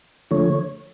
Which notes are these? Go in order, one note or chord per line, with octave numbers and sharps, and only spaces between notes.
D3 F3 A3 C#5